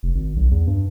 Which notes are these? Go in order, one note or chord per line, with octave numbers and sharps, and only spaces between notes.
F1
G#1
B1
E2
G2